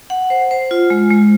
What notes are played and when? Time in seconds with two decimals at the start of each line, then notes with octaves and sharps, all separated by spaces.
0.10 F#5
0.30 C5
0.51 C5
0.71 F4
0.90 G#3
1.10 G#3